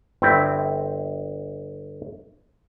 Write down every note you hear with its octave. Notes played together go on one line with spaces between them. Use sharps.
G1 C4 E4 G5